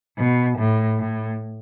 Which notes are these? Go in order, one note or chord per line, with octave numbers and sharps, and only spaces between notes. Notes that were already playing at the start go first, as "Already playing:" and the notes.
B2
A2
A2